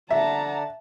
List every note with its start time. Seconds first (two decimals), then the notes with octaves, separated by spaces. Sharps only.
0.11 D3 D5 E5 F#5 A5 A#5